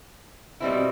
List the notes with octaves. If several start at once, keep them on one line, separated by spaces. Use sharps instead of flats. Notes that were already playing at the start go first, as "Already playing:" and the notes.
B2 G3 C4 E4